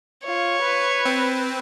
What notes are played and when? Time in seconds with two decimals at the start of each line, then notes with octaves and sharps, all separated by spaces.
0.25 F4 C#5
0.63 B4
1.06 C4